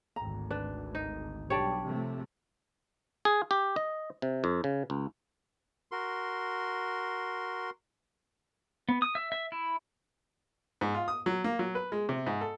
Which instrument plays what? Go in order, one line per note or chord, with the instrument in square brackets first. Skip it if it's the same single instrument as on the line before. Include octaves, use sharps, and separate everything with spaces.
[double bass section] G#1 D2 [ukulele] A#5
[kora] D4 [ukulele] B4
[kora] D#4
[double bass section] B1 G3 [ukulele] D4 G4 A5 [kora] C#5 D5
[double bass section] C3 F3 A3
[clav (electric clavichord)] G#4
G4
D#5
C3
F2
C#3
C#2
[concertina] F#4 A#4 C6
[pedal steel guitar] B3
D#6
E5
E5
E4
[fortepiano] G#2
F4
D#6
F#3
A#3
F#3
B4
G#3
C3
G#2
A4